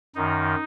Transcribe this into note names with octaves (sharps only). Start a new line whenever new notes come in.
F#2 D#3 D#4